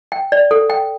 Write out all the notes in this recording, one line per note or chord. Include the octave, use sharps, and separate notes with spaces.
G5
D5
A4
G5